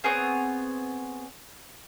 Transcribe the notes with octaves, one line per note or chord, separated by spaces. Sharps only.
B3 C4 G#4 C#5